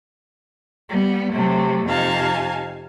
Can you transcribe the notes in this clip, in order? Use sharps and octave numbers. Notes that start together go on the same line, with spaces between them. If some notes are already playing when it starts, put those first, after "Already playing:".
G3 B3
C3 F#3 A3
F2 C3 D#4 F5 G#5 A5